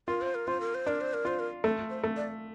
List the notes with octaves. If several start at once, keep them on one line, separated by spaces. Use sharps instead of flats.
F4 A#4
C5
A#4
F4 C5
A#4
C5
D4 A#4
C5
A#4
F4 C5
A#4
A3 A4
C5
A3
D5